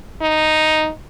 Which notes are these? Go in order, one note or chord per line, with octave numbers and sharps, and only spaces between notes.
D#4